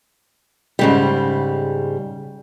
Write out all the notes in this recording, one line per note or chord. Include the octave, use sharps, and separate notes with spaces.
G#2 C#3 G3